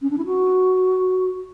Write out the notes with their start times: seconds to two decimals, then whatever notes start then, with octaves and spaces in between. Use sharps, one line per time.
0.02 C#4
0.11 D4
0.18 E4
0.26 F#4